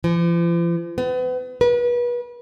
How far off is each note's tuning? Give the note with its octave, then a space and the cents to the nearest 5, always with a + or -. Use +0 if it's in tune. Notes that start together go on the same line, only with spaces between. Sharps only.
F3 -45
B3 +35
B4 -35